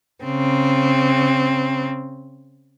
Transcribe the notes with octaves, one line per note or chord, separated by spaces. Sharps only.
C#3 C4